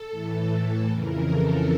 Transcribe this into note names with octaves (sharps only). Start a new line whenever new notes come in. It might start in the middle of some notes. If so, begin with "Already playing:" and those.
Already playing: A4
A2 E3
F2 C#3 E3 A#4
A4